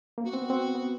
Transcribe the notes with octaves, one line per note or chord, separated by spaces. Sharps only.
A#3
B3 F#4
C4
B3
C4
B3